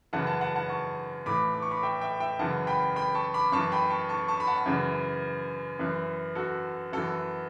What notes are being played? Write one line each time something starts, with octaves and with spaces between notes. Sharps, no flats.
F#2 C#3 E3 F#5 A5
F#5 A5
F#5 A5
F#5 A5
A5 C#6
A2 E3 B5 D6
D6
C#6
B5 D6
E5 G5
E5 G5
E5 G5
F#2 C#3 E3 F#5 A5
G5 B5
G5 B5
A5 C#6
B5 D6
F#2 E3 A5 C#6
G5 B5
A5 C#6
A5 C#6
A5 C#6
B5
F#5 A5
F#2 C#3 E3
F#2 E3
F#4 A4
F#2 E3 F#4 A4